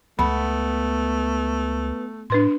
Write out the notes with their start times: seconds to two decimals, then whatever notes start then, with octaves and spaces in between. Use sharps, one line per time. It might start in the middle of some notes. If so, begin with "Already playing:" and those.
0.19 C#2 A3 B3 B5
2.30 A2 D4 B4 C6